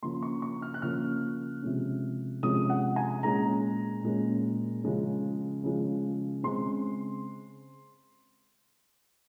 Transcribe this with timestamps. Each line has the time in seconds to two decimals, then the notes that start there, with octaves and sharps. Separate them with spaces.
0.03 C#3 F3 A#3 C6
0.22 C#6
0.42 C#6
0.62 F6
0.74 F#6
0.82 C#3 F3 A#3 F6
1.62 C3 F3 G#3 C#4
2.43 C3 F3 G#3 C#4 D#6
2.70 F#5
2.96 G#5
3.23 A#2 G#3 C#4 A#5
4.03 A#2 G#3 C#4
4.83 C#3 F3 G#3 C#4
5.64 C#3 F3 G#3 C#4
6.43 C#3 G#3 C4 C6